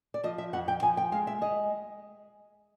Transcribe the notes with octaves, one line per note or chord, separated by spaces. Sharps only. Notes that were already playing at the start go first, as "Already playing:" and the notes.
D5
F3 D#5
E5
F2 F#5
G5
F3 G#5
G5
G#3 F5
E5
G#3 D#5